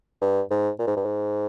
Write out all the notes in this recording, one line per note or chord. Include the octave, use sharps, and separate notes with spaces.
G2
G#2
A#2
G#2
G2
G#2